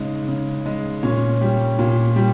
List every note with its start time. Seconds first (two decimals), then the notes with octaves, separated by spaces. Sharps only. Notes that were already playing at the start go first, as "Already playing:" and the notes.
Already playing: C#3 G#3 D#4
0.28 C#3
0.66 G#3
1.03 A#2 C#4 C#5
1.41 G3
1.79 A#2
2.16 G3